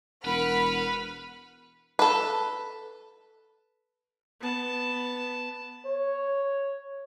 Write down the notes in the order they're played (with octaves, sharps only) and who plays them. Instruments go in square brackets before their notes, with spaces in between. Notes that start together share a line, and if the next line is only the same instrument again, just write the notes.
[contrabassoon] E1 [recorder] A#4 [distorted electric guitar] B4 [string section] F#5 B5 F6
[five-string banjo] A4 B4
[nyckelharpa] B3 A5
[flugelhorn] C#5